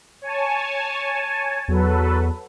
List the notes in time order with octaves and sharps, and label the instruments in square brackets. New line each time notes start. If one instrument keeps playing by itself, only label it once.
[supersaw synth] C#5 G#5 A5
[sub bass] E2 [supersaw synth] F#3 A4 B4